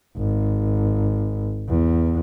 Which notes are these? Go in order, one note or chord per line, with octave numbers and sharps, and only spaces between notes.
G#1
E2